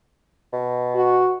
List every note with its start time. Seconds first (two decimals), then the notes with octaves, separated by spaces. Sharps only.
0.53 B2
0.95 F#4